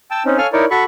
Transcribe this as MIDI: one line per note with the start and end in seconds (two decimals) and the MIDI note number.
0.11 0.23 79
0.11 0.23 81
0.11 0.23 88
0.25 0.38 60
0.25 0.38 61
0.25 0.38 63
0.38 0.47 69
0.38 0.47 73
0.38 0.47 77
0.38 0.47 80
0.38 0.47 89
0.53 0.65 63
0.53 0.65 64
0.53 0.65 70
0.53 0.65 73
0.53 0.65 74
0.71 0.84 66
0.71 0.84 69
0.71 0.84 83
0.71 0.84 85